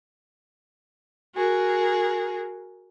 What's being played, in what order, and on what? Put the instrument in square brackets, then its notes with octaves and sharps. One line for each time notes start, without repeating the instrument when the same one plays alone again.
[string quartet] F#4 G#4 A#4